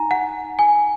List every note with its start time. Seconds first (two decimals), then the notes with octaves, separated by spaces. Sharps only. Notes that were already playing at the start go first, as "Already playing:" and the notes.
Already playing: D#4 G#5 A#5
0.11 F#5
0.59 G#5